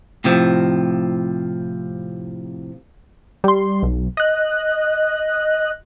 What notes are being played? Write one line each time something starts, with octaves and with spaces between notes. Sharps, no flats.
A2 C3 F3
G3 C6
B1
D#5 F#6